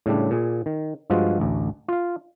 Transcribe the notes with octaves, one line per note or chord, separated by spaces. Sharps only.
A2 C#3 G3 D4
A#2 G#4
D#3
G2 F3 G#3 F4 F#4
A1 D2
F4 F5